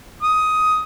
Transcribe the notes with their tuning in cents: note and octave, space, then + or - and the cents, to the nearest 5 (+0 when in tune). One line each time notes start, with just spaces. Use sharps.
D#6 +10